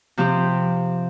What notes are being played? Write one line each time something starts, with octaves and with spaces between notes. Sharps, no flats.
C3 F3 C4 G4 C5